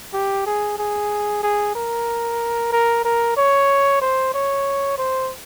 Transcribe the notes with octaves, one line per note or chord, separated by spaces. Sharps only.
G4
G#4
G#4
G#4
A#4
A#4
A#4
C#5
C5
C#5
C5